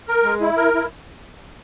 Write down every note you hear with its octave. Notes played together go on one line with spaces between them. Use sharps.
A#4
G#3
E4
A#4
E4